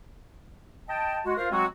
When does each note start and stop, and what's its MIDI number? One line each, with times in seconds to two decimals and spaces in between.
0.88 1.19 75
0.88 1.19 79
0.88 1.19 81
1.24 1.36 56
1.24 1.36 66
1.37 1.49 65
1.37 1.49 70
1.37 1.49 72
1.37 1.49 77
1.51 1.65 54
1.51 1.65 56
1.51 1.65 60
1.51 1.65 66